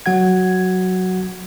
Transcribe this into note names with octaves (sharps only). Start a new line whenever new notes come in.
F#3 F#4 F#5 G#6